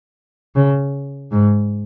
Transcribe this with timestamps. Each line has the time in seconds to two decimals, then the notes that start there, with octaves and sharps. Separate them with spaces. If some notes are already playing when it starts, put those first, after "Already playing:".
0.55 C#3
1.32 G#2